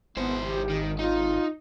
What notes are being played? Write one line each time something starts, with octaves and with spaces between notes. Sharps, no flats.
G#1 B3 E4 C5
G4
D#3
D#4 F4